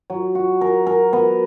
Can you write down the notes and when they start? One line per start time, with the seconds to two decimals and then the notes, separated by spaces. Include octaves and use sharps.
0.10 F#3
0.35 F#4
0.61 A#4
0.87 A#4
1.13 B3